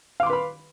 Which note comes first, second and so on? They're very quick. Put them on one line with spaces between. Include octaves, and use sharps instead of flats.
F5 D6 C6 B4 B5